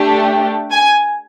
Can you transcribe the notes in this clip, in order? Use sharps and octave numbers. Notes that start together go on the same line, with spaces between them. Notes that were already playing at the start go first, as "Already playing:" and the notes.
Already playing: A3 D4 G4
G#5